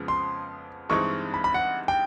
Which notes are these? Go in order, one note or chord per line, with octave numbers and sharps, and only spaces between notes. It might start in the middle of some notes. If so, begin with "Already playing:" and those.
Already playing: F2 C#3 F3 G#3 B3
C6
G2 E3 G#3 C4 D#4 C#6
B5
B5
F#5
G5